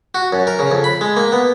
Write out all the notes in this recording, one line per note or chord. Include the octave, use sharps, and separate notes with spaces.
F#4
F#2
A#4
C#3
F2
B5
G#3
A#3
B3